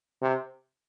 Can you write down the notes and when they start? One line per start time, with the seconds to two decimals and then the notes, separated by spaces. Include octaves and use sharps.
0.22 C3